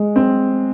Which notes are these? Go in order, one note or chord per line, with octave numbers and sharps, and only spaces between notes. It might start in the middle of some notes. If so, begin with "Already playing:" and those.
Already playing: G#3
C4